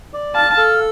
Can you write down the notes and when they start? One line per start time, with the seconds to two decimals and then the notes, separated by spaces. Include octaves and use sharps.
0.13 D5
0.35 F5 A5
0.57 A4